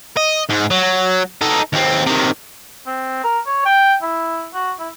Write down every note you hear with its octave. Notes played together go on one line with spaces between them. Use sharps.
D#5
G#2
F#3
D#4 A4
D#2 C4
C3 D#3
C4
A#4
C#5
G5
E4
F#4
E4